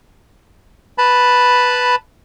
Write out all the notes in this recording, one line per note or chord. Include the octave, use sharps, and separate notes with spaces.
B4 A5 B5